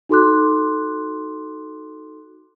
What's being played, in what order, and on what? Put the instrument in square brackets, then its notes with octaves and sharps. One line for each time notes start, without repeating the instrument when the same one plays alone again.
[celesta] D#4 F#4 A4 C6 D6 F#6